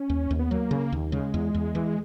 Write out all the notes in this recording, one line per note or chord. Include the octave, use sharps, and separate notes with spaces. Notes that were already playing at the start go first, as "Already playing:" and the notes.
Already playing: C#4
D#2
D#2
B3
F#3 A#3
C#3
D#2
C#3 G#3
E2
E2
E3